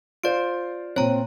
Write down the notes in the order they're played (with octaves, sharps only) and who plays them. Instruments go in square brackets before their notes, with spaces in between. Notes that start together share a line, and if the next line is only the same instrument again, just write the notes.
[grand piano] F4 C5 [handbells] D5 D7
[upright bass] A#2 A#3 [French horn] C4 [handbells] C#5 A#5